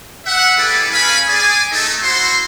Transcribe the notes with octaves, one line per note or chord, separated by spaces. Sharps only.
E5 F#5
G3 E4 G#4 A4 B4 D5
A3 C#4 B4 F5 G#5 B5
G#4 D5 G#5
A3 D#4 A4
E4 F#4 C5 C6